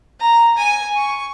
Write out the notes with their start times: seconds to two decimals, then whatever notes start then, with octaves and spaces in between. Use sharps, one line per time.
0.20 A#5
0.57 G#5
0.96 C#6